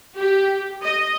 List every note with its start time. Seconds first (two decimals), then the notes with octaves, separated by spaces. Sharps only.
0.16 G4
0.83 D#5